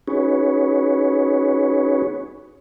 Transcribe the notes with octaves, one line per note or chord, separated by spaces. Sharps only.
C#4 D#4 F#4 G#4 B4 C#5